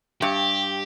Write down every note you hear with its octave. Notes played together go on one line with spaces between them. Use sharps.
G2 G4